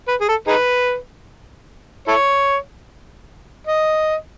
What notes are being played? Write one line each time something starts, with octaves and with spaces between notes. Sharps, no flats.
B4
G#4
A4
D#4 G#4 B4
E4 A4 C#5
D#5